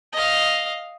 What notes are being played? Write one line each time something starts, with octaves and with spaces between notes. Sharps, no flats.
D#5 F5